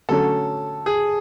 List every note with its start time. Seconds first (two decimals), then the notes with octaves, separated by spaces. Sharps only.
0.09 D3 F#3 A3 C#4 A4
0.86 G#4